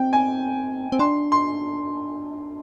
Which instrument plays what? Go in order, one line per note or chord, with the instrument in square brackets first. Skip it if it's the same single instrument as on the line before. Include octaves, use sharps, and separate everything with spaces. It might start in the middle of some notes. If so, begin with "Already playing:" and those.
Already playing: [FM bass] C4 [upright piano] G5
[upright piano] G#5
[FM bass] C4
[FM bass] D4 [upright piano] C6
[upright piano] C6